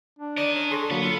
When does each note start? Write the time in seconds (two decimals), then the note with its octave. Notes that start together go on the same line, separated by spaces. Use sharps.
0.19 D4
0.37 A#4 D5 D#5
0.55 C#4
0.71 G#4 A4 C6 C#6
0.91 D3 F#3 A#3 B4 F#5
1.03 F4 A4